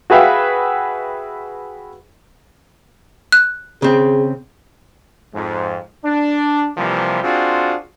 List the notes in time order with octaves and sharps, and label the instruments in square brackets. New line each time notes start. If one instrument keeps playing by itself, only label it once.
[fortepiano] F#4 G#4 B4 E5 F5 G5
[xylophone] F#6
[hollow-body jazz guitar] C#3 C4 [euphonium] G#4
[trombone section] F2 G#2
D4
C3 E3 F3 G3 A#3
C4 D4 F4 F#4 G#4